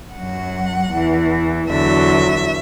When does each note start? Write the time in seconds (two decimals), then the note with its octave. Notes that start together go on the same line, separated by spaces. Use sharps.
0.14 F#2 F#3 F#5
0.91 E2 E3
1.68 E2 D3 F#3 E5